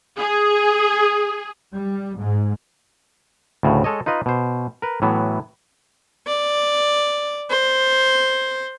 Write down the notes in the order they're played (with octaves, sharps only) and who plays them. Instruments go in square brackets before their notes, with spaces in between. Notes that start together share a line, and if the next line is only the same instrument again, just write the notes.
[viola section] G#4
[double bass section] G3
G#2
[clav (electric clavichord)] D2 A2 C#3
G#3 A4 C#5 D#5
D#4 F4 B4 D#5
B2 C5
A#4 B4
A2 E3 F#3 B3
[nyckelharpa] D5
C5